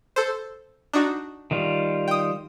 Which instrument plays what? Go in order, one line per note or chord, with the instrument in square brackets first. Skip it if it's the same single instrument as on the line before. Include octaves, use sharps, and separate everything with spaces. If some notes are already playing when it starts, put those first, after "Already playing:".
[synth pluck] A4 C5
D4 D#4 F#4
[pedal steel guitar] D#3 G3 F4
[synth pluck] G5 D#6